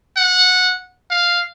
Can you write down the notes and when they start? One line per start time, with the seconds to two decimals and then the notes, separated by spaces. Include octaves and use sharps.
0.17 F#5
1.11 F5